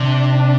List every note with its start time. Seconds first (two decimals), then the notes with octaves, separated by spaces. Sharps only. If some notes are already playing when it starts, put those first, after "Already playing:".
Already playing: C3 D4
0.37 D4